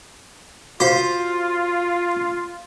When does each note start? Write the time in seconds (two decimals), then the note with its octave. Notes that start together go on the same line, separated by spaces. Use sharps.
0.80 F4 F#4 C5 F5